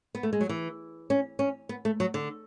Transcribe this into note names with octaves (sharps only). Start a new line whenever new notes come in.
B3
A3
G#3
F#3
E3
C#4
C#4
B3
A3
F#3
D3